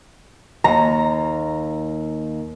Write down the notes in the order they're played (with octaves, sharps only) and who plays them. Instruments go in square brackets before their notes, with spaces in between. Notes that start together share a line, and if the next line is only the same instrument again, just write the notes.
[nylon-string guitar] D#2 [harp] A#5